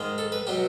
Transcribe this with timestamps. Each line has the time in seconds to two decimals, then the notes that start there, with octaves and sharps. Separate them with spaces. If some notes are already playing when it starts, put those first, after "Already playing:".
Already playing: G#2 D#3 G#3
0.18 A4
0.32 B4
0.47 B2 F#3 G4